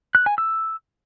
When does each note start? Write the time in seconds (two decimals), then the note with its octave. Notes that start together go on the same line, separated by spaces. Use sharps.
0.15 F#6
0.26 G#5
0.38 E6